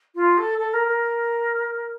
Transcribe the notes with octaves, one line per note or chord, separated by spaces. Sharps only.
F4
A4
A4
A#4
A#4